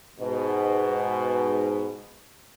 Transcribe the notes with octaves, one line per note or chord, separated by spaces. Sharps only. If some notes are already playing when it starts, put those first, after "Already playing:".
G#2 B2